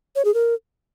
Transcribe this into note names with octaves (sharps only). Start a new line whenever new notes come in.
C#5
G#4
A#4